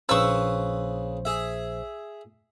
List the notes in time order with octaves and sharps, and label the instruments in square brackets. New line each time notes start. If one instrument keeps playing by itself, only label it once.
[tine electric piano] A#1 C5 [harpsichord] C#3 B4 D#6 [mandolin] C#6 E6
[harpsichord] G#4 E5